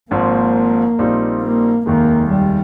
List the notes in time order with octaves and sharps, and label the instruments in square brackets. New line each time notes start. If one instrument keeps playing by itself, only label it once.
[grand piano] G#1 G#2 F3 C4 [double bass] A#3
[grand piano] A#1 A#2 G3 C4 D#4
[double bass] A#3
[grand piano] F1 D#2 D#3 G#3 [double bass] A#3
[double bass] G3